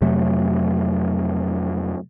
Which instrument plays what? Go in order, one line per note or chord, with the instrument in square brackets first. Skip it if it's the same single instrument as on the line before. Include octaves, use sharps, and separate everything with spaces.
[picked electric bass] F2 C3 F#3 A3